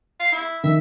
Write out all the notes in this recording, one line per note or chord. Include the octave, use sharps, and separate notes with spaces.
F5
E4
D#3 E5